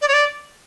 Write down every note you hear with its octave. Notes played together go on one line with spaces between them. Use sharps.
D5
C#5
D5